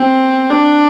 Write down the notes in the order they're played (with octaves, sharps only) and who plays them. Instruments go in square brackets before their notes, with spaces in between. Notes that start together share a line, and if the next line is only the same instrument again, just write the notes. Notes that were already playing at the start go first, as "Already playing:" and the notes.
Already playing: [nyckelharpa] C4
D4